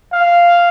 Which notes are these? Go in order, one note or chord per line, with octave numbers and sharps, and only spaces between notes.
F5